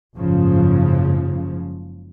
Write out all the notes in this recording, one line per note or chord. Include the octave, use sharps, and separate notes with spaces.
F#1 G#2 C#3 F3